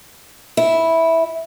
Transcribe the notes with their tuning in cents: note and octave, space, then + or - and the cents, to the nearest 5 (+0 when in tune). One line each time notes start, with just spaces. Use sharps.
E4 -10